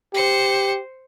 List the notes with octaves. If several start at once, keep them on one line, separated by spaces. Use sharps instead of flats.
G4 C5 C#7